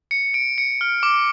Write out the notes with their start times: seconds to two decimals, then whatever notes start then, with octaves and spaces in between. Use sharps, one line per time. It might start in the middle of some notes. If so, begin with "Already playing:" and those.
0.11 C#7
0.34 D7
0.58 C#7
0.81 F6
1.03 D6